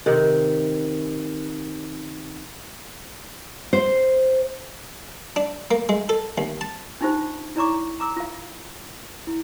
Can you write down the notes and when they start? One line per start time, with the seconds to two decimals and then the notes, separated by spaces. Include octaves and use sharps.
0.06 C3 D#3
3.73 C5
5.36 D4
5.71 A#3
5.89 G#3
6.09 A4
6.38 D#2
6.61 A5
7.01 D4 D#4 F4 G4 C5
7.56 E4 C#5 D5 A#5 C#6 D6
8.00 A#5 D6 E6
8.17 F4 F5
9.27 E4